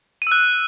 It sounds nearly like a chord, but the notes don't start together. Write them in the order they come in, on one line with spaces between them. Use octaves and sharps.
D#7 E6 F#6